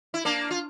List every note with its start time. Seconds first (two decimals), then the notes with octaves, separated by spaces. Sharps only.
0.14 E4
0.25 A#3 D4
0.51 F4